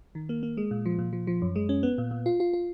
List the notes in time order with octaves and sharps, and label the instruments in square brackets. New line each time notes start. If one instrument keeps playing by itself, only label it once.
[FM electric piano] D#3
A#3
A#3
G#3
A#2
F3
A#2
F3
F3
F#2
G#3
C#4
B3
A#2
A#2
F4
F4
F4